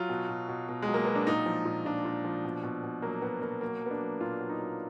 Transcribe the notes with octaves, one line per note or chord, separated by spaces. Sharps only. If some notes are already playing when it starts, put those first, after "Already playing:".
Already playing: F#3 F4
B2
B2
B2
B2
G#3
F#3
A#3
F#3 B3
D4
A#2 D#4
F3
A#2
A#2 D4
A#2
F3
B2
B2
B2
F#3 A#3
B2 B3
B2 A#3
F#3 A#3
F#3 B3
D4
F#3
A#2 F4
F#3
D#4
F#3